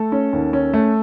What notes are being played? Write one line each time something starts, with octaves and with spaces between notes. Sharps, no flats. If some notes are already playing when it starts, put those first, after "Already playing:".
Already playing: A3 A4
C#4
D#2
C#4
A3